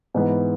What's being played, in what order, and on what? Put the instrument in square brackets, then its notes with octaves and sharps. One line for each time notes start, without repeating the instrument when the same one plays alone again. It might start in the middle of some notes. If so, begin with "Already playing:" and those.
[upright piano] G#2 E3 B3